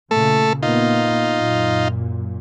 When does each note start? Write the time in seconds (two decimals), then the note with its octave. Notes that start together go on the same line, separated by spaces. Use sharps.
0.11 A#2 C#3 A3 A4
0.63 A#2 A#3 B3 D#4 F4
1.37 F#2 A#2